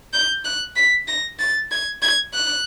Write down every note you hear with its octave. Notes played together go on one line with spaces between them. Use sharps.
G6
F#6
B6
A#6
A6
G#6
G#6
F#6